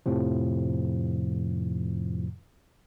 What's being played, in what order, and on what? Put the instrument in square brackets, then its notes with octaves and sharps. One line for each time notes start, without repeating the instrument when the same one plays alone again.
[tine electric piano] F2 A2 C3 F3